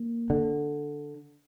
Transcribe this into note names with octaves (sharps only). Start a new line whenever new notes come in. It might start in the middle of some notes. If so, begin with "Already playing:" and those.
Already playing: A#3
D3